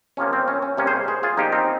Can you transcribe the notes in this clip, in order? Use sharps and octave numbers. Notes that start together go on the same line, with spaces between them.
C3 F3 A#3 C#4
C4
C#4
C#4
C3 G3 A#3 C#4
G#4 C5
G#4 C5
F4 G#4
A#2 F3 A#3 D#4 G4
C4 D#4